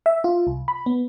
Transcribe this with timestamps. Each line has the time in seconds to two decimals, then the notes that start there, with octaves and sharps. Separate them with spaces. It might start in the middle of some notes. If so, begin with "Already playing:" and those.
0.06 E5
0.24 F4
0.47 C2
0.68 B5
0.86 B3